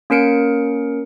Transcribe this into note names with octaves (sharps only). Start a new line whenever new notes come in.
A#3 C#4 A#4 C#7 D7